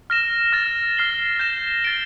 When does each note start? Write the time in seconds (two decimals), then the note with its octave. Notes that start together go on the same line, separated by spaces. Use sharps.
0.10 F6 A#6 E7
0.53 F6 A6 E7
0.97 F6 C7 G7
1.39 G6 A#6 E7
1.84 F6 A6 D7 G7